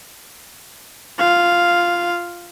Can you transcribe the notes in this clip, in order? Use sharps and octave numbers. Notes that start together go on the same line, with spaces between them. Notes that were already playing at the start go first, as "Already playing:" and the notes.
F4 F5